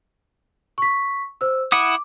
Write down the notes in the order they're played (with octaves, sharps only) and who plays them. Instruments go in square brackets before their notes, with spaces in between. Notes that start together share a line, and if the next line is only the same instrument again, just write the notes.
[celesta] C#6 B6
C5 E6
[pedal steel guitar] E4 F#5 D#6 [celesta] D6